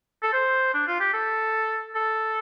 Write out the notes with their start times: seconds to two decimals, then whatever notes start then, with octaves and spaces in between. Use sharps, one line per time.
0.23 A4
0.33 C5
0.74 D4
0.87 F4
1.00 G4
1.13 A4
1.95 A4